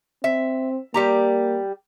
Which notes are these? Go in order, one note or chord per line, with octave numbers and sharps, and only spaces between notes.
C4 E5
G3 A#3 G4 A#5